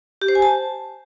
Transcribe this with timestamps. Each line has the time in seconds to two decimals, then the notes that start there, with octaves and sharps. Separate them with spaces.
0.22 G4
0.28 C5
0.35 G#5
0.42 A5